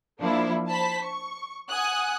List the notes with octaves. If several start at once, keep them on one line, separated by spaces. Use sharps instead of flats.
F3 A#3 D4 E4
C5 A5 B5 B6
C#6
F#5 G#5 D#6 F#6